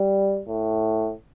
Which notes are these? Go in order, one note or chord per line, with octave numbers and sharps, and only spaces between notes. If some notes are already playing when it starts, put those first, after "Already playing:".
Already playing: G3
A2